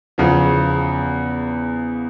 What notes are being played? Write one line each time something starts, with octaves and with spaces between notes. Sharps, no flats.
E2 C#3 F3